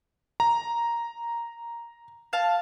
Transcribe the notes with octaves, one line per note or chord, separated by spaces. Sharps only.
A#5
F5 A5